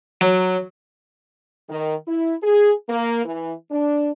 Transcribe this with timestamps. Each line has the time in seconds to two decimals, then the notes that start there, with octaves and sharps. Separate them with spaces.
0.21 F#3
1.69 D#3
2.08 E4
2.42 G#4
2.89 A#3
3.24 E3
3.71 D4